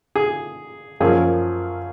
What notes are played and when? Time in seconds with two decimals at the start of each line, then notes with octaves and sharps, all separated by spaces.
0.16 G#4
1.00 F#2 F3 A#3 C#4 G#4